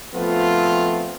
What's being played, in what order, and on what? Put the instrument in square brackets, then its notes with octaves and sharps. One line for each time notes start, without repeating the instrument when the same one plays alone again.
[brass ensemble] F3 A3 B3 C4 F4